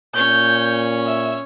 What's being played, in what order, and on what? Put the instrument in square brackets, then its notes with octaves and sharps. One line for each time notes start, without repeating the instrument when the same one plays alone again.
[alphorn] A#2 [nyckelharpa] C#4 C#5 [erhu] G6
[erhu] E5